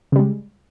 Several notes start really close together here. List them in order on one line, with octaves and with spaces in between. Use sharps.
C#3 G3 G#3